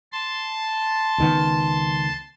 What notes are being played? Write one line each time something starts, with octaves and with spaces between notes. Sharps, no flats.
A5 C6
C#2 D#3 B3